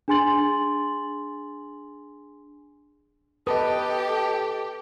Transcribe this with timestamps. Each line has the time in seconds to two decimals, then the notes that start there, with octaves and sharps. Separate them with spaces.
0.08 D4 G#4 G#5 C6 A6 F#7
3.47 G4 A4 B4 D#5 A5 D#6